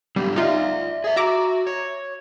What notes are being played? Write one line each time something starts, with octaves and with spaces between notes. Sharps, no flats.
D3 G3 B3
D#4 F4 D5 E5
G#4 E5
F#4 E5 A#5 D6
C#5